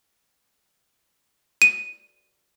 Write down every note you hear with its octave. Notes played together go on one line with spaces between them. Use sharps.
D#7